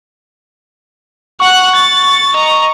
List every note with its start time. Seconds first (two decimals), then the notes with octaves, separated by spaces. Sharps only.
1.40 F#5 C#6 F#6
1.75 A6
2.33 D#5 A#5